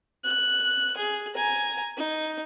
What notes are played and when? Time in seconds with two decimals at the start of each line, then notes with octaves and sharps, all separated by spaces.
0.25 F#6
0.97 G#4
1.35 G#5 A#5
1.97 D#4